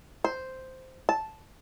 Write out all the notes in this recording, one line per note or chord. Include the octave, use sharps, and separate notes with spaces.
C5
A5